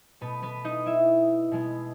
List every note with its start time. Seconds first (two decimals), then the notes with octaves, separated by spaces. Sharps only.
0.21 B2 A3 B3 B4
0.43 B3 B4
0.65 D#4 D#5
0.86 E4 E5
1.52 B2 G#3 B3